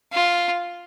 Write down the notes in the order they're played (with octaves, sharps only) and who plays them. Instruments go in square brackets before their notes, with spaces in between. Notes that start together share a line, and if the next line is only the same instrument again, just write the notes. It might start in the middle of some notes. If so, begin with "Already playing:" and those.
[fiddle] F4